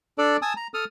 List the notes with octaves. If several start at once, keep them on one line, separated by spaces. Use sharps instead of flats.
D4 A4 D5
G#5 A5 D#6 E6
A#5
A4 D#6 F6